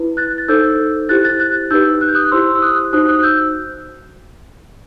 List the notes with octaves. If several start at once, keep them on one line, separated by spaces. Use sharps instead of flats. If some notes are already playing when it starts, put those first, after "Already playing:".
Already playing: E4 B4
F#6 A6
A6
D#4 A4 C5 E6 G6
E4 G4 C5 F#6 A6
F#6 A6
F#6 A6
D#4 G4 B4 E6 G6
F#6
G6
D#6 F#6
E4 G4 C5 C6 E6
E6
D#6 F#6
D#4 F#4 C5 D#6 F#6
D#6 F#6
E6 G6